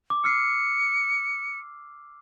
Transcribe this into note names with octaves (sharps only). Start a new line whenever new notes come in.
D6
E6 F6 C7 C#7